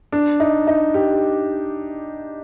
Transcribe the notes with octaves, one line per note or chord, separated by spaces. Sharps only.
D4
D#4
D#4
G4